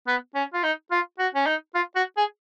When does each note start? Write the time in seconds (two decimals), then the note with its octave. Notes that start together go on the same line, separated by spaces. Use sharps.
0.07 B3
0.35 C#4
0.53 F4
0.63 D#4
0.91 F4
1.19 F#4
1.35 C#4
1.46 D#4
1.75 F4
1.96 F#4
2.17 G#4